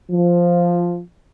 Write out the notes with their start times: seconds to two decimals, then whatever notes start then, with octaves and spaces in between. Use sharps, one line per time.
0.11 F3